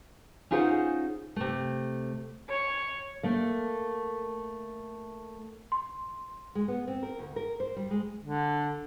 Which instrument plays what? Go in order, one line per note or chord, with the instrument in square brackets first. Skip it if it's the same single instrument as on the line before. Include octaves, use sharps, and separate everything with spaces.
[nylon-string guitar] C#4 D#4 F4 G#4 C5 F#5
C3 A3
[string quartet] C#5
[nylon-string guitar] A3 A#3
[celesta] C6
[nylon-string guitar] G#3
B3
C4
A#4
D2
A#4
C5
G3
G#3
[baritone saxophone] D3